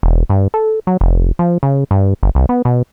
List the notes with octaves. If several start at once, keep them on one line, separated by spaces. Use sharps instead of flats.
E1
G2
A4
F#3
F1
F3
C#3
G2
G1
C2
B3
B2